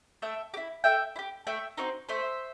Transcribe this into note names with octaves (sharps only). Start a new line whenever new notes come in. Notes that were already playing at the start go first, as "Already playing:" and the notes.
A3 E5 G5
G4
E4
A3 E5 G5
E4
G4
A3 E5 G5
C4 D#4 F#4
A3 C5 E5